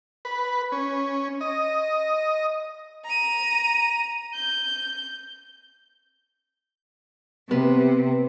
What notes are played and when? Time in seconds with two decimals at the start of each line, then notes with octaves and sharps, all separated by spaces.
0.25 B4
0.72 C#4
1.41 D#5
3.05 A#5 D#7
4.34 G6
7.51 C3 B3